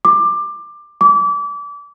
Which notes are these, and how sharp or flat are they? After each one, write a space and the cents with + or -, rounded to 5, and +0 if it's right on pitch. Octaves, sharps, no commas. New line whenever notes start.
D6 +20
D6 -30